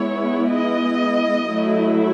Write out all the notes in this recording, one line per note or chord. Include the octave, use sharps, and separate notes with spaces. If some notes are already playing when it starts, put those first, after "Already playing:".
Already playing: G#3 B3 E4 C#5
D#5
F#3 A3 E4